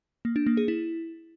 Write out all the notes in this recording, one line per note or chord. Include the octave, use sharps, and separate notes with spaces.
A#3
D4
A#3
G#4
E4